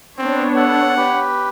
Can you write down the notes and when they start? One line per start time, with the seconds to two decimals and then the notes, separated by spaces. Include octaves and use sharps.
0.18 B3 C4 D4 C#5
0.56 A4 F#5
0.97 G4 B4